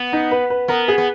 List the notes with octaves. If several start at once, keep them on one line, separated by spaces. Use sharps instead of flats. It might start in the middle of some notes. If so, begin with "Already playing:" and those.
Already playing: B3
D#4
B4
B4
B3 A#4
G#4
B3